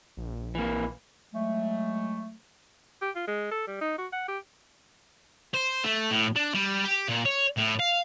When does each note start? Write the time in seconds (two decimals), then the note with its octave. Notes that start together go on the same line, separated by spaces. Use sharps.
0.17 A#1
0.55 E3 A#3
1.32 F#3 G#3 A3
3.02 G4
3.16 F4
3.27 G#3
3.51 A4
3.67 G3
3.81 D#4
3.98 F#4
4.13 F#5
4.28 G4
5.54 C5
5.84 A3
6.11 A2
6.36 D4
6.54 G3
6.84 G4
7.09 A#2
7.25 C#5
7.57 A2
7.79 F5